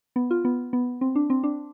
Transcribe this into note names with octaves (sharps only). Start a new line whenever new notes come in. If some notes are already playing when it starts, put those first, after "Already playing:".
B3
F4
B3
B3
C4
D4
C4
D4